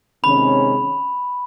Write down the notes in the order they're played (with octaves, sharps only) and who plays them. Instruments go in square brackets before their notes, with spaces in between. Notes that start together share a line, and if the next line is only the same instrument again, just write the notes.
[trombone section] C3 D#3 G#3 C#4 [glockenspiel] B5